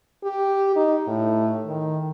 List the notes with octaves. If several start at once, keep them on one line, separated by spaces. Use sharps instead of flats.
G4
D#4
A2
D#3